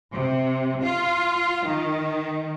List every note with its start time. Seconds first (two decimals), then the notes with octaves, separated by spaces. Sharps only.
0.13 C3
0.82 F4
1.66 D#3